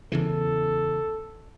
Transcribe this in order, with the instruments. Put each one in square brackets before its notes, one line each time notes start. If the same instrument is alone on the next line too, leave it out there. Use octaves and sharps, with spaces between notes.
[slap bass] E2 C#3 E3 [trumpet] A4